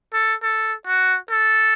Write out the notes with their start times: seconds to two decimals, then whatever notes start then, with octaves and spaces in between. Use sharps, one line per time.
0.13 A4
0.43 A4
0.87 F#4
1.30 A4